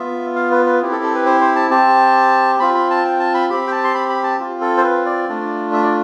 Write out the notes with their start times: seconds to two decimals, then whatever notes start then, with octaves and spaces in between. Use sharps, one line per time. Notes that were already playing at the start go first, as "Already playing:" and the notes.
Already playing: B3 F4 E5
0.36 F5
0.51 B4
0.66 B4
0.82 C4 E4 G4
0.92 A4
1.03 A4
1.14 B4
1.26 C5
1.41 C5
1.56 A5
1.71 C4 G4 A5
2.60 C4 F4 B5
2.74 B5
2.90 A5
3.05 G5
3.20 A5
3.34 B5
3.50 C4 G4 B5
3.67 G5
3.72 A5
3.84 C6
3.95 B5
4.09 B5
4.23 A5
4.39 C4 F4
4.61 A4
4.78 C5
4.84 B4
5.06 D5
5.29 A3 D4 F4
5.73 E5
5.83 D5